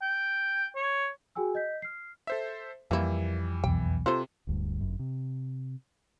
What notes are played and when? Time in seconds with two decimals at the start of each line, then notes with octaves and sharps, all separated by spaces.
0.02 G5
0.76 C#5
1.35 F#4 G#4 G5 G#5 E6
1.55 D#5 G6 B6
1.82 F6 C7
2.27 A4 C5 E5
2.91 F2 E3 G3 A#3 E4
3.64 B1 E2 G5
4.06 C3 F4 A4 C5
4.47 D1 D2 G2
4.81 G1 F#2
4.99 C3